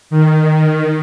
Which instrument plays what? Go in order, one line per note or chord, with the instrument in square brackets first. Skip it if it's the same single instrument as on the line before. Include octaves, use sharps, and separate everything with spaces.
[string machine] D#3